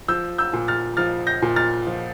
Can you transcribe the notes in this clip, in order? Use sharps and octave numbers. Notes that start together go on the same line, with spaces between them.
F3 E6 G6
E6 G6
A#2
F6 A6
F3 F6 A6
G6 A#6
A#2
F6 A6
F3